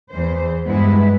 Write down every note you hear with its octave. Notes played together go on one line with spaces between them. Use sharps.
E2 E3 C5
G2 G#3 B3 E4 B4